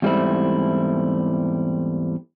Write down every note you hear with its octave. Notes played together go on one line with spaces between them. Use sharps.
E2 G#2 G3 A3 C4 E4